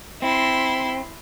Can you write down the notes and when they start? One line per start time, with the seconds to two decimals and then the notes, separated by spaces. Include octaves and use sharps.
0.22 C4 E4 C6